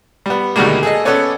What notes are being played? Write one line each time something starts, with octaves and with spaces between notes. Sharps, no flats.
G3 B3
D2 B2 D#3 G3 G#3 A#3
G#4 A4 D#5
B3 C#4 A4 B4 C#5 D5